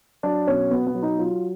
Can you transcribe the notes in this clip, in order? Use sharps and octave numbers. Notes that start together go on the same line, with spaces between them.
F#3 D4
B2 C#4
B2 B3
B3
F#3
D#4
F#3 F4